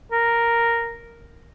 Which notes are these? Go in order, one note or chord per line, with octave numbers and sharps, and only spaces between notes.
A#4